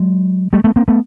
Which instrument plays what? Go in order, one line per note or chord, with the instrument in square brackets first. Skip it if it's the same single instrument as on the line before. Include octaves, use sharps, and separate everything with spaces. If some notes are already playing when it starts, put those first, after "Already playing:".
Already playing: [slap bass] F#3 G#3
G3 A3
A3 B3
A#3 C4
A3 B3